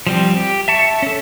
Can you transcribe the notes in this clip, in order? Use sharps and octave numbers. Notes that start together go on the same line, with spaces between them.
F3 G3 C4
G4
E5 A5 C#6
C#4 A4